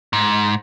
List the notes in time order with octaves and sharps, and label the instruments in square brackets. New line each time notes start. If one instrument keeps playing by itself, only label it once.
[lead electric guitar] G#2